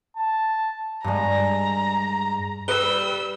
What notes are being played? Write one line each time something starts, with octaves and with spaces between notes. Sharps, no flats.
A5
G2 G#3 A#5
G3 B4 E6 G7